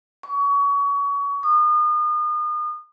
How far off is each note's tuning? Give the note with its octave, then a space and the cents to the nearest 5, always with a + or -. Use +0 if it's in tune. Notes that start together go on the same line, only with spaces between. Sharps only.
C#6 +30
D#6 -35